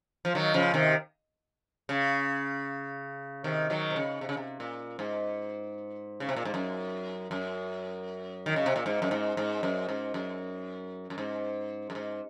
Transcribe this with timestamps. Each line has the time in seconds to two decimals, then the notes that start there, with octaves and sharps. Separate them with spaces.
0.25 F3
0.35 D#3 F#3
0.54 C#3 F3
0.74 C3 D#3
1.89 C#3
3.44 C3 D#3
3.70 D#3 F#3
3.90 C3
3.96 C#3
4.21 C3
4.29 C#3
4.37 C3
4.60 A#2
4.99 G#2
6.20 C#3
6.29 C3
6.36 A#2
6.45 G#2
6.54 F#2
7.31 F#2
8.46 D#3
8.56 C#3
8.66 C3
8.76 A#2
8.86 G#2
9.02 F#2
9.11 G#2
9.37 G#2
9.63 F#2
9.89 G#2
10.14 F#2
11.10 F#2
11.18 G#2
11.90 F#2
11.95 G#2